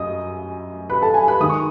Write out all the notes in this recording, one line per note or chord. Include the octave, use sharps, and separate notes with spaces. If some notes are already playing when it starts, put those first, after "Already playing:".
Already playing: F#2 D#5 D#6
B4 B5
A4 A5
G#5
B4 B5
D#3 G#3 D#4 D#6
C#6